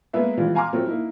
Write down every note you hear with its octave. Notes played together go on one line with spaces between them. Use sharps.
G#3 A#3 B3 B4 E5
E3 F3 G3 G#3 F4
F5 G#5 A#5 C6 D6 F6
F3 F#3 A3 C4
A#3 D#4 E4